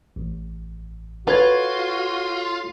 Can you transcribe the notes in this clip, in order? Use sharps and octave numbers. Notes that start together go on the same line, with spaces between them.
A1
F4 F#4 A4 B4 C#5 G#6